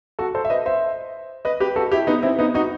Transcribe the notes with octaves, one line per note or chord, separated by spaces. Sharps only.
F#4 A4
A4 C5
E5
B4 D#5
C5 E5
B4 D#5
G4 B4
F#4 A4
E4 G4
B3 D#4
C4 E4
B3 D#4
D#4 F#4